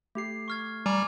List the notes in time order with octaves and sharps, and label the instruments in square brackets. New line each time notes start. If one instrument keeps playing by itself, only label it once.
[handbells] A3 G4 C7
[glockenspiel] C#6 F6 G#6
[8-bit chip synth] G3 [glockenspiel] G#5 A#5 D6